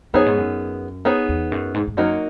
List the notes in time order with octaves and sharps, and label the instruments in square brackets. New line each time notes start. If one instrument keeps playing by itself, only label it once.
[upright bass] F#2 [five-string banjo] B3 D#4 G#4 C#5
[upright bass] G#2
F#2
[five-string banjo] B3 D#4 G#4 C#5
[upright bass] E2
F#2
G#2
G#2
[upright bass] F#2 [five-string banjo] F#3 A#3 D#4 F#4